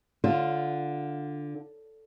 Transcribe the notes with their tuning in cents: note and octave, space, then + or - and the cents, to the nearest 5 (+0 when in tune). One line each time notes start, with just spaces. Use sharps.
D3 +0 F4 +0